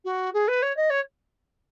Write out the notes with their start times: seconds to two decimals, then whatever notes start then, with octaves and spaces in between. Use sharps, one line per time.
0.05 F#4
0.34 G#4
0.48 B4
0.62 C#5
0.77 D#5
0.90 C#5